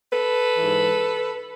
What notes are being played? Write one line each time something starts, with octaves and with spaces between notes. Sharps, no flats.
A4 B4
G#2 E3